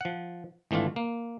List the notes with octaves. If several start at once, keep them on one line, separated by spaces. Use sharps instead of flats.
F3 F#5
G#1 E3 A3 D4 F4
A#3